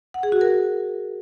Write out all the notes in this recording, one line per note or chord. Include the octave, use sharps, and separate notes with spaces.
F#5
G#4
F#4
A#4